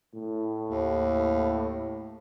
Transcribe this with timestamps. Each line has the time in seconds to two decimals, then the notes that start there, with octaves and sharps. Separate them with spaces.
0.14 A2
0.69 D#2